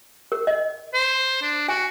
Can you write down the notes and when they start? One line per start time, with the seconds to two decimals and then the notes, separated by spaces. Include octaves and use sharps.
0.32 A#4
0.47 D#5
0.94 C5
1.42 D4
1.69 F#4 G#5